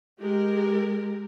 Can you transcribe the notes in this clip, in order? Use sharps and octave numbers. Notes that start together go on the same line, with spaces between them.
G#3 G4 A#4